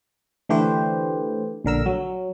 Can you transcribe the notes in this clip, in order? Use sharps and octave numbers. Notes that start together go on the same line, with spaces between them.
D3 E3 A3 G4 B4 C5
A#1 D3 A#4 E6
F#3